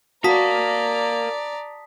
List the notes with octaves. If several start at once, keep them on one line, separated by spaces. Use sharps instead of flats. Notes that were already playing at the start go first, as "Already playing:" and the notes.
F#4 A#4 D5 F5 A5 A#5 D#6 B6